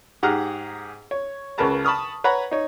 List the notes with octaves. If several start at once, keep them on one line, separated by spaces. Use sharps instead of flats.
G#2 G4 G#4 F#5 A#5 F6
C#5
C#2 C#3 A#4 B4 A5 A#5
A5 B5 C#6 D#6 F6
B4 C#5 F#5 A#5 B5
D#4 C#5